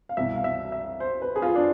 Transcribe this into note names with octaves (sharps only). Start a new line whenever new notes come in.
F5
C2 B2 E5
F5
E5
E5
C5
B4
G#4
F4
D4